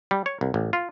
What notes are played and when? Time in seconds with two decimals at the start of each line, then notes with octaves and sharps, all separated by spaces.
0.11 G3
0.26 C#5
0.41 C2
0.54 A1
0.73 F4